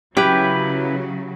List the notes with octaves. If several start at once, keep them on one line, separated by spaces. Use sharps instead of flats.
C#3 F#3 C#4 E4 G4 B4